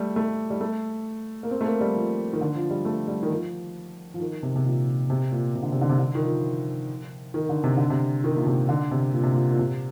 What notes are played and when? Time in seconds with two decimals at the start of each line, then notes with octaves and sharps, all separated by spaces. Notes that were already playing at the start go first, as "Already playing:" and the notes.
Already playing: G3 A3
0.16 A3
0.50 G3
0.61 A3
1.43 A#3
1.51 C4
1.61 A3
1.66 A#3
1.81 G3
1.96 F3
2.33 D#3
2.41 D3
2.55 F3
2.70 G3
2.85 A3
3.08 G3
3.23 D#3
3.30 F3
4.14 F3
4.20 D#3
4.43 C3
4.56 C3
4.65 A#2
5.10 C3
5.32 A#2
5.55 C3
5.63 D3
5.72 C3
5.81 D3
5.89 C3
5.99 D3
6.15 D#3
6.23 F3
7.34 D#3
7.49 D3
7.64 C3
7.77 D3
7.90 C3
8.24 D#3
8.36 A#2
8.46 C3
8.69 D3
8.91 C3
9.13 A#2
9.23 C3
9.33 A#2
9.51 A#2
9.59 C3